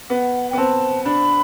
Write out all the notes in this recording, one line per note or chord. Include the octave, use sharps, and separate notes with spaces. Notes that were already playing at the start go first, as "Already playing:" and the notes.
B3 F#5
G5
B3
C4 A5
D4 B5